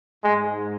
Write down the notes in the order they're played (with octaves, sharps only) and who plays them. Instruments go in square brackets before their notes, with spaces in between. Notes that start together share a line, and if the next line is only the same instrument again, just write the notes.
[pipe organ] G#2 [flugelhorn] G#3